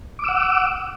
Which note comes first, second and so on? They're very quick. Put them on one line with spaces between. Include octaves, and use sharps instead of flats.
D6 E6 F#5